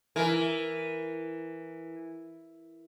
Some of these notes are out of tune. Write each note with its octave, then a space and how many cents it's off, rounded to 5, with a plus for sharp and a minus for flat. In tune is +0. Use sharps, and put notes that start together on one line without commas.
E3 +0 A#4 +0